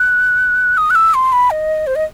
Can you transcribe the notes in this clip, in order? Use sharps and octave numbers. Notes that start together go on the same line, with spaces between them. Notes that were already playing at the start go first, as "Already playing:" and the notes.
Already playing: F#6
D#6
F#6
E6
C6
B5
D#5
C5
D#5